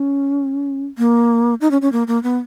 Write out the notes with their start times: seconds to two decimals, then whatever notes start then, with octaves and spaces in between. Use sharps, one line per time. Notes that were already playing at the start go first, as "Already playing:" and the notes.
Already playing: C#4
0.98 A#3
1.61 D#4
1.71 C#4
1.82 C#4
1.92 A#3
2.07 A#3
2.23 B3